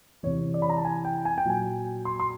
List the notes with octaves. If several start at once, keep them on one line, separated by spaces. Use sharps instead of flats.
C3 E3 C#5
D5
B5
A#5
A5
G#5
G5
G#5
G5
A#2 F#3 G#5
C6
C6